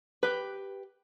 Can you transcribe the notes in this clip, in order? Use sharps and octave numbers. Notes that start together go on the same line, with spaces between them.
G4 B4